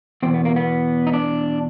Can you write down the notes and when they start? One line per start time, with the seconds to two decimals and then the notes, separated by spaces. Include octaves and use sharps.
0.23 E2 B2 C4
0.34 B3
0.45 A#3
0.56 B3
1.07 D#4
1.13 D4